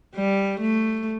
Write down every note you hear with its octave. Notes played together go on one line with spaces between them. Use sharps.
G3
A3